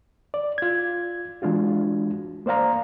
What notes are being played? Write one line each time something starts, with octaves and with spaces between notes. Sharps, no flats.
D5
F4 G#6
E3 G#3 D4 F4 F#4
A#3 C5 D5 F5 A#5